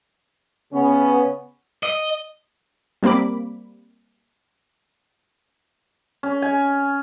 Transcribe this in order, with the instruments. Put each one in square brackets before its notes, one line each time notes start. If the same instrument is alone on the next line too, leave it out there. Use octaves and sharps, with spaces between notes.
[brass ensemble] C#3 B3 C#4
[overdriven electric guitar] D#5
[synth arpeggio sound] G3 A#3 C4 B5 D6
[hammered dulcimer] C#4
G#5